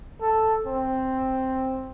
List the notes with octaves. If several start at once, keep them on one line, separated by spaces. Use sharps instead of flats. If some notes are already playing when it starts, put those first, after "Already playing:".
A4
C4